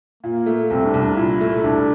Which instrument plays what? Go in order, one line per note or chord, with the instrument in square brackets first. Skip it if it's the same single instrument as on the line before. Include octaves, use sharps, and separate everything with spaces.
[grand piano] A#2 [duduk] A#3
[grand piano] A3
[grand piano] C2 [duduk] C4
[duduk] D4
[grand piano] C2
[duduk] D4
[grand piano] A#2 [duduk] E4
[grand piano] A3
[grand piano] C2 [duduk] D4